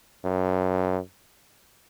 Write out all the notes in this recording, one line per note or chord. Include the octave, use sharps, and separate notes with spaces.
F#2